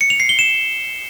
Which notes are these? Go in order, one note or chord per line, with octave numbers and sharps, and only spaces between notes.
C#7
F7
C7
G7
E7